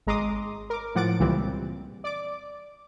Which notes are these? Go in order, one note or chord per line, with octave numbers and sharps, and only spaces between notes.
G#1 G#3 A#5 C6 D6 D#6
A#4 D6
A2 F3 F#5 D6 A6 D7
C#2 A#2 C#3 E3 G3 C4
D5 D6